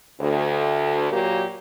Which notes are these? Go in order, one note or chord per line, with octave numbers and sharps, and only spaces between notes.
D2
A#2 F#3 A#3 G4